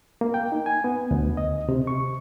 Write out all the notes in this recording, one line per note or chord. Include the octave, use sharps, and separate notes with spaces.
A#3
G5
D#4
G#5
B3
D2
D#5
C3
C#6